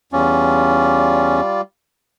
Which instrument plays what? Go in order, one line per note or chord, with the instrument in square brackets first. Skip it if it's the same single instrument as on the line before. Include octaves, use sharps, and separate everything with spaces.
[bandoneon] E2 C#4 [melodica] G3 F4 D5